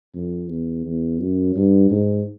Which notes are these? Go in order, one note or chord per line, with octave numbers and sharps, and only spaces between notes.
F2
E2
E2
F#2
G2
G#2